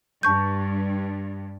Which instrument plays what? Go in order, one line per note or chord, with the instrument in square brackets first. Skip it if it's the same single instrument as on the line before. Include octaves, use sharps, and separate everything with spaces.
[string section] G2 [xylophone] A5 C#6 G6